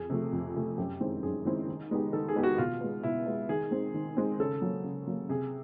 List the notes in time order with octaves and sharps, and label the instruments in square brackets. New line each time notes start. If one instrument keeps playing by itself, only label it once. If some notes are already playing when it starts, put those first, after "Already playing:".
Already playing: [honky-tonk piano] F2 [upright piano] G#4
[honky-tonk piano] C3 F3 A3
F2
C3 F3 A3
[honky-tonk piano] F#2 [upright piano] G4
[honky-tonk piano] D#3 G#3 C4 E4
[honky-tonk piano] F#2 [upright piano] G#4
[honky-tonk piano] D#3 G#3 C4 E4
D#3
G#3 B3 D#4 G4
[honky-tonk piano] D#3 [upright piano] A4
[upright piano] G#4
[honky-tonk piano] G#3 B3 D#4 G4
[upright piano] F#4
[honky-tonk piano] B2 [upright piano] F4
[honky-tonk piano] G#3 B3
[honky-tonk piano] B2 [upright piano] E4
[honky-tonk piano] G#3 B3
[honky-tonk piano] D#3 [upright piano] G#4
[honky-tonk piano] G#3 C4
D#3
G#3 C4
[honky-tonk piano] C#3 [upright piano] A4
[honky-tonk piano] F#3 A#3
C#3
F#3 A#3
[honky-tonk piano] C3 [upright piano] G#4